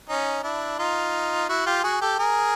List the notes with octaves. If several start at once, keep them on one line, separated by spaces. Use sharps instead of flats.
C#4 D#4
D4 E4
D#4 F4
E4 F#4
F4 G4
F#4 G#4
G4 A4
G#4 A#4